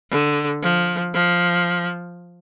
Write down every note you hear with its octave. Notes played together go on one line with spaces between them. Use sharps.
D3
F3
F3